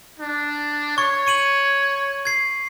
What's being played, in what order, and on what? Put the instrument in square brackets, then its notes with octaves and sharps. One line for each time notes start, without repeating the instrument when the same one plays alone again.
[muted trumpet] D4
[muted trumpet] C#5 [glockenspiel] C#6
[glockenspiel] C#6 D#7 F#7
G#6 C7